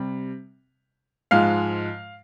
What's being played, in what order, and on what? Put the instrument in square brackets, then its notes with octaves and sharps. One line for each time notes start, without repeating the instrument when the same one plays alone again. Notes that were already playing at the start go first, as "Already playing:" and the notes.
Already playing: [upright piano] C3 G3
G#2 F3 G#3 F5 F6